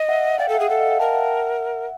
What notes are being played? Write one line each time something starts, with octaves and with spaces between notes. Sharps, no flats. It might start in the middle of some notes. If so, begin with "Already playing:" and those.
Already playing: D#5
E5 F#5
D5 F5 G5
A4
E5 F#5
G#4
A4 E5 F#5
D#5 F5
F5 G5
A#4 G5 A5
E5 F#5